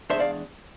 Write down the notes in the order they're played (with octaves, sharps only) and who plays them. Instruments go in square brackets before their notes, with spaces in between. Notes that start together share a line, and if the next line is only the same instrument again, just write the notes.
[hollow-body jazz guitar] E2 B2 G#3 D4 C5 E5
D5 F5